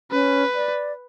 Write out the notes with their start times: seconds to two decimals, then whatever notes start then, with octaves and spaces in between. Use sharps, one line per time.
0.11 C#4 B4
0.55 D5